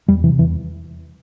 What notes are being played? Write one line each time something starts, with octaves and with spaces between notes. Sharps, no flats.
E2 G3
C3 E3
E2 E3